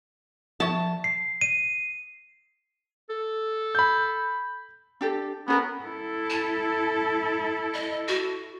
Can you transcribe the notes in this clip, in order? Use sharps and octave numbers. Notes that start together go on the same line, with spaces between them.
F3 E5 A5 C#6
C7
D#7
A4
B5 G6
D4 G4 A4
B3 C#4 G#4 A#4
E4 A4
A5
D#5
F#4